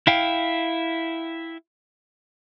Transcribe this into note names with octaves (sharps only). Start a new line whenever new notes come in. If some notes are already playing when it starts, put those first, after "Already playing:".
E4 F5 G5